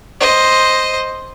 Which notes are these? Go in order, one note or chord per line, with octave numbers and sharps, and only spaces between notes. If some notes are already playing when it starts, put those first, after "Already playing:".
C5 D#5